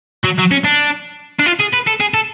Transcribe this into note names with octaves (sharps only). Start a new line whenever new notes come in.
F#3
F#3
C#4
D4
D4
F4
G#4
B4
A4
G#4
A4